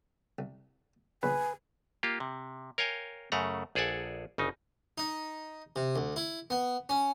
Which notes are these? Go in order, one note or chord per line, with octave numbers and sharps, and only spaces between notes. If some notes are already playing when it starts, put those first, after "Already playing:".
C2
A#1 C#3 B4 G#5
A#3 F4 G4
C3
A#4 C#5 F5 G5 G#5
F#2 C#3 A3 F#5 A#5
A#1 G#4 A4 D5 F#5 G#5
G1 C#3 D#4
D#4
C3
D2
E4
B3
C#4